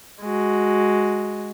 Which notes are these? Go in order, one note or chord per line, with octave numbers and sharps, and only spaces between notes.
G#3 F#4